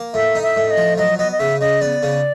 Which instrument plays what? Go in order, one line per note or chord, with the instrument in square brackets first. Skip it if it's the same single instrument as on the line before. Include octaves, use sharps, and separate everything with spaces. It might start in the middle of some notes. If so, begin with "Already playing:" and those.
Already playing: [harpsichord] A#3
[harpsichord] A2 [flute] E5
[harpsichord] D#4
[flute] E5
[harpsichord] A2
[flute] D#5
[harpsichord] F3
[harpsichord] F#3 [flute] D#5
[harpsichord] B3 [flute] D#5
[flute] D#5
[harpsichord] C#3 [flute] E5
[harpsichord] C#3 [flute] D#5
[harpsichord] B3 [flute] D5
[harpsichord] C#3